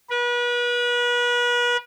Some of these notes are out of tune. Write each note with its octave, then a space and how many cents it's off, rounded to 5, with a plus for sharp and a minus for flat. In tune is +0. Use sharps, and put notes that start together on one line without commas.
B4 -35